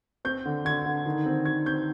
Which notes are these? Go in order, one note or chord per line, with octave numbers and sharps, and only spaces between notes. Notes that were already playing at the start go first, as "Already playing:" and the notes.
C4 G6
D3
D3 G#6
D3
D#3
C4
D#3 G#6
C4 G6